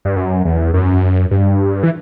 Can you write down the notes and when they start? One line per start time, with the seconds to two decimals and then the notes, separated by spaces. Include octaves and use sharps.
0.05 G2
0.16 F#2
0.45 E2
0.74 F#2
1.31 G2
1.83 E3